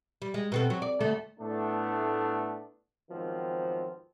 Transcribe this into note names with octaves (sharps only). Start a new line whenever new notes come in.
G3
G#3
B2 C4 A4
F#3
D5
D2 A3 A4
A2 A3 B3 D4
G#2 D#3 F3 F#3 B3 C4